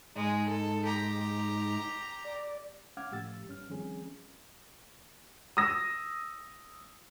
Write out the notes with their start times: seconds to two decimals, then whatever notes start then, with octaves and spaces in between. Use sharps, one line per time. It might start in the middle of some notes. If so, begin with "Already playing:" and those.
0.15 G#2 G#3 D#4
0.48 A4
0.85 G4 A#5
2.24 D5
2.97 C#4 F5 F#5 D6 F6 G#6
3.11 A2 F3 G4 E6 A6
3.48 G2 C#4 F6
3.69 D#3 F3 G3 C4 C#4 G#4
5.57 D#6 E6 A#6